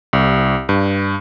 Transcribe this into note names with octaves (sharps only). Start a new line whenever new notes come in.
C2
G2